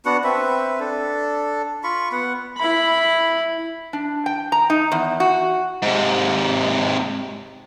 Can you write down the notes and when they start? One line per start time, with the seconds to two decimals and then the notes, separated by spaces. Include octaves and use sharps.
0.05 B3 D4 F#4 F#5
0.24 C4 B4 E5
0.80 D4 A4
1.84 F4 B5 C#6
2.12 B3 F#5
2.58 E4 B5
3.93 D4
4.26 G5
4.52 A#5
4.70 D#4
4.92 E2
5.20 F#4
5.82 G#2 C3